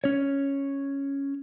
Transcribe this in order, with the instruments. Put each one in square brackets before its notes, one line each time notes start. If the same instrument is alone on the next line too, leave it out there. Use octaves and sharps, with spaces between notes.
[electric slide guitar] C#4 C#5